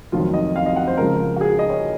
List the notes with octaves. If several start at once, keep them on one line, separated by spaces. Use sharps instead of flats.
F1 F2 D#3 F#3 F4
D#5
F5
D#5
F#5
C5
C#2 C#3 F3 A#4
F#4
G#4
D#5
C#5